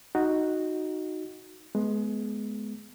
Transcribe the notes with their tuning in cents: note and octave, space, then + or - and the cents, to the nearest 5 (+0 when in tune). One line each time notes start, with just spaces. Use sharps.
D#4 +0 F#4 +0
G#3 +25 B3 +0